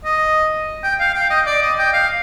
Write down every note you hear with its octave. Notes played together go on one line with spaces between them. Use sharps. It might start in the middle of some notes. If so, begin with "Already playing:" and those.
D#5
G5
F5
G5
D#5
D5
D#5
G5
F5